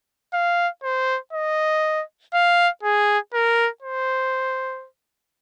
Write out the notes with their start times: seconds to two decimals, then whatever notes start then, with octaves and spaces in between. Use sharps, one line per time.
0.34 F5
0.83 C5
1.33 D#5
2.34 F5
2.83 G#4
3.34 A#4
3.83 C5